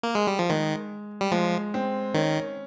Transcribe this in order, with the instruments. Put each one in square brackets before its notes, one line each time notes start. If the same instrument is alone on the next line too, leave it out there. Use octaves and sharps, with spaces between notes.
[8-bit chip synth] A#3
G#3
G3
F3
[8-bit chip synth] D#3 [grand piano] G#3
[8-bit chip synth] G3
[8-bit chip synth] F3 [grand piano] G#3
[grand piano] C4
[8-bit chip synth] D#3 [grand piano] C#4